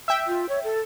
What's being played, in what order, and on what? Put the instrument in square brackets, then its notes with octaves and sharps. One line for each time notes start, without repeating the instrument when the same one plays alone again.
[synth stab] E5 G5
[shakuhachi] F4
C#5
A4